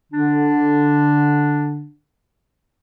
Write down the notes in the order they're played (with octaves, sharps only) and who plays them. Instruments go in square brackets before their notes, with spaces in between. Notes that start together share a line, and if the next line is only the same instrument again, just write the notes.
[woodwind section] D3 D4